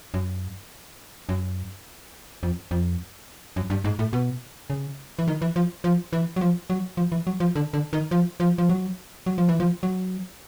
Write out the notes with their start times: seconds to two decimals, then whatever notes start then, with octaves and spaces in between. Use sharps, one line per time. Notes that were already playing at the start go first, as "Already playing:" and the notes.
0.14 F#2
1.29 F#2
2.43 F2
2.71 F2
3.56 F#2
3.70 G2
3.84 G#2
3.99 A2
4.13 B2
4.70 C#3
5.19 E3
5.28 D#3
5.42 E3
5.56 F3
5.84 F3
6.13 E3
6.36 F#3
6.41 F3
6.70 F#3
6.97 F3
7.12 E3
7.27 F#3
7.40 F3
7.56 D3
7.73 D3
7.93 D#3
8.11 F3
8.40 F3
8.58 F3
8.69 F#3
9.26 F#3
9.38 F3
9.49 E3
9.60 F3
9.83 F#3